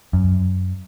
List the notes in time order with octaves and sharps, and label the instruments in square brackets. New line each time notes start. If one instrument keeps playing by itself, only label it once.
[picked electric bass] F#2